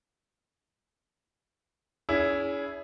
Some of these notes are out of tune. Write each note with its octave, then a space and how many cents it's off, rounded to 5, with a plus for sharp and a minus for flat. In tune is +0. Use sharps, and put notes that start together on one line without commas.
C#4 +40 E4 +0 G#4 +0